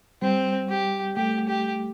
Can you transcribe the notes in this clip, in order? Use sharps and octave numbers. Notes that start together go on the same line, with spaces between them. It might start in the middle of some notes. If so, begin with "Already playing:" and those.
G3 C4
G4
A3 G4
G4